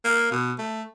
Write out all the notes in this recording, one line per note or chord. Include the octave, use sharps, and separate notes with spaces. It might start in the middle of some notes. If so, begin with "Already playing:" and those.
A#3
B2
A3